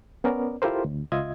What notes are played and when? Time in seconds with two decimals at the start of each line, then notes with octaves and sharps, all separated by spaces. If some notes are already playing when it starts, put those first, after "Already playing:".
0.24 B3 C#4 A#4 D5
0.62 E4 F4 G4 A4 A#4 C5
0.85 D2
1.12 C#2 F4 D#5 E5 G#6